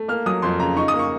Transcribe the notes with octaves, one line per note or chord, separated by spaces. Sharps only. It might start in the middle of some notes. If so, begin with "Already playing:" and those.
Already playing: A3
A#3 F6
F#3 D#6
F2 C6
C#3 A#5
D#4 C#6
D#6
A#3
C#6